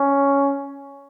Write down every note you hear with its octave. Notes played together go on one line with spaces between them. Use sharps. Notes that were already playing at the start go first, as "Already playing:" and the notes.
Already playing: C#4